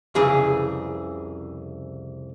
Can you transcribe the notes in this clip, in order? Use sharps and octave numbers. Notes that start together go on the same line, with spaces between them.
C2 F2 C#3 E3 G#4